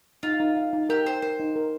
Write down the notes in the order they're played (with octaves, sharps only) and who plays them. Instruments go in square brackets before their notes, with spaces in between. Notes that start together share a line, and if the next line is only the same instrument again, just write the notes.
[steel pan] D#4 [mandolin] F4
[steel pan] D#4
F5
D#4
[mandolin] G4 [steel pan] A#4
[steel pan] A#4 [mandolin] C5
[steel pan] A#4 [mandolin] C5
[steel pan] D#4
A#4